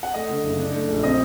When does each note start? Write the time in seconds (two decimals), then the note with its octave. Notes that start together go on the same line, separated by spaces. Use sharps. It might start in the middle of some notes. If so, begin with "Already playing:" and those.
0.03 F#5
0.14 A3 D#5
0.29 D3
0.44 F#1
0.59 D4
0.74 A3
0.89 A#1
1.03 C4 D#5